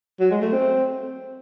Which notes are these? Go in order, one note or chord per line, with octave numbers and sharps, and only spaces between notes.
F#3
G#3
A3
C4